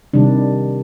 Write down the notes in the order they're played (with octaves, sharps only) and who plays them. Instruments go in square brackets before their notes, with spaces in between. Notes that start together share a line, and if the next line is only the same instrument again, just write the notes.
[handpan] C3 D#3 G3 D4